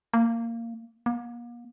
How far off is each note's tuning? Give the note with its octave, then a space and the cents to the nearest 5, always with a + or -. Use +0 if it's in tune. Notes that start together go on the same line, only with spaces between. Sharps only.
A#3 -15
A#3 +40